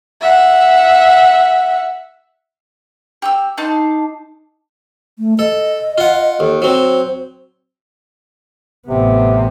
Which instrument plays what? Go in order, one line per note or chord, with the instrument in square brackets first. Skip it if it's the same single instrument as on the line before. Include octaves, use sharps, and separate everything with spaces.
[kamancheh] E5 F#5
[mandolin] G4 D#6 E6
D4 D#4 A5 C6
[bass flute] A3
[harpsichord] A4 [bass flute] D#5
[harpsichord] F4 F#5
[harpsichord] D#2 [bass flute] A4
[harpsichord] F#3 C4 [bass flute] C5
[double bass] A1 B3 [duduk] C3